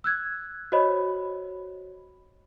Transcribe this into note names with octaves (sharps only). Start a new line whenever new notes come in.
E6 F#6 G#6
F#4 C5 C#5 D#5 B5